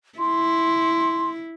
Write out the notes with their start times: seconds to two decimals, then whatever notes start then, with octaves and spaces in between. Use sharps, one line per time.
0.19 E4 C6